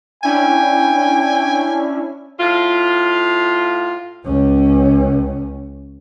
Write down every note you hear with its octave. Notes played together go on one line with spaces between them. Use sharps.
C#4 D4 E4 G5 G#5
A2 F4
C#2 C#4